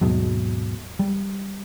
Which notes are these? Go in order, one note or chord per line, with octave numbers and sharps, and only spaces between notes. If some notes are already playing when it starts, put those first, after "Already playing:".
D#2 G#2 B2 F#3
G3